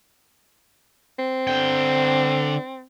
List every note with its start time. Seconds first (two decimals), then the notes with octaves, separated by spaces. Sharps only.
1.19 C4
1.47 D3 G5